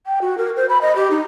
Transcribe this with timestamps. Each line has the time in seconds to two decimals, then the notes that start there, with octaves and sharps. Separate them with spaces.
0.07 G5
0.22 F#4
0.38 A#4
0.57 C5
0.69 B5
0.82 D#5
0.96 G4
1.11 D#4